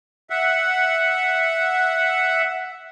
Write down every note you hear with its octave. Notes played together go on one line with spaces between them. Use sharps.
E5 F#5